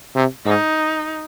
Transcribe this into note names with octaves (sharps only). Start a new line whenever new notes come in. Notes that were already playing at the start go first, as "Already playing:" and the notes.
C3
G#2 D#4